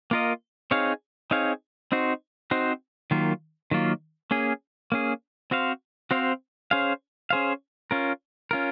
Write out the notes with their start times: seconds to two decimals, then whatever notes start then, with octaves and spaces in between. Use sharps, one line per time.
0.11 A#3 F4 A#4 D#5
0.71 C4 D#4 G#4 C#5 F5
1.31 C4 D#4 G#4 C#5 F5
1.92 C4 D#4 F#4 C5
2.51 C4 D#4 F#4 C5
3.11 D#3 F#3 A#3 F4
3.71 D#3 F#3 A#3 F4
4.31 A#3 C#4 G#4
4.92 A#3 C#4 G#4
5.51 C4 F#4 C5 F5
6.11 C4 F#4 C5 F5
6.71 C#4 G#4 C5 F5
7.30 C#4 G#4 C5 F5
7.91 C#4 F4 A#4
8.51 C#4 F4 A#4